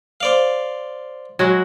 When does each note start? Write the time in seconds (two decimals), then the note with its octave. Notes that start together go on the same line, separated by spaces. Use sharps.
0.21 C5 D5 F5
1.39 F#3 G#3 F#4